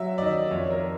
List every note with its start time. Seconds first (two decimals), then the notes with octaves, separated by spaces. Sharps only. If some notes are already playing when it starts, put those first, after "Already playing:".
Already playing: F#3 E5
0.18 D5
0.22 D#3 D#5
0.51 F2 C#5
0.70 A#4